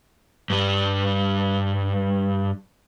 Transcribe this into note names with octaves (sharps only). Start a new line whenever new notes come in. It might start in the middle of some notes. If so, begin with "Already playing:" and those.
G2 G3